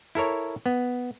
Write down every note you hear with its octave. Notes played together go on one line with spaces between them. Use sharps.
E4 A4 A#4 C#5
B3